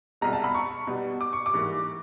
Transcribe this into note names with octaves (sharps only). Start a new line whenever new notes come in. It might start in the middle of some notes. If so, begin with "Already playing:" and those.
C2 B2 G#3 A#5
A5
B5
C#6
B2 G3 B3
D6
C#6
D6
G#2 E3 G3 A#3